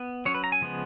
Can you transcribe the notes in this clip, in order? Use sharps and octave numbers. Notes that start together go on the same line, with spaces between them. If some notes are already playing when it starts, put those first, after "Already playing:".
Already playing: B3
F#3 C#4 C#5
B4
A#5
G#5
C#3 F3 G#3 B3